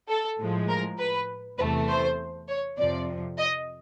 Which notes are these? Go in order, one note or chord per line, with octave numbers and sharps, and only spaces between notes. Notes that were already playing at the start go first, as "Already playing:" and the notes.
A4
A2 F3 G#3
A#4
B4
E2 C3 E3 A3 B4
C5
C#5
F2 C3 F3 D5
D#5